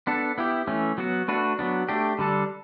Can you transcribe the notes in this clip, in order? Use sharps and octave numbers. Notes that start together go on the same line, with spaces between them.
B3 D4 A4
B3 E4 G4
E3 A3 C#4
F#3 B3 F#4
A3 D4 F#4 B4
F#3 B3 D4
A3 D4 G4
D3 G3 D4 A4